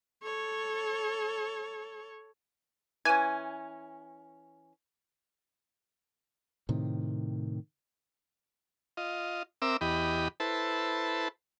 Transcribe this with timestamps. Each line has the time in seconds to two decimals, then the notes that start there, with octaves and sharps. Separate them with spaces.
0.23 A4 C#5
3.05 E3 C#4 G#5
6.69 A2 C3 D#3
8.97 F4 D#5
9.62 C4 A#4 E5 D6 E6
9.81 E2 G4 D#5 B5
10.40 E4 A4 B4 C5 A5